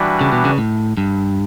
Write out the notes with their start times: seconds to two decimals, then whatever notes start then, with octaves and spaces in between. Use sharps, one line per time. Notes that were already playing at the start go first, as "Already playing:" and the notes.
Already playing: E3 G3 D4 F#4 B4
0.21 C#3
0.32 B2
0.45 C#3
0.58 A2
0.97 G2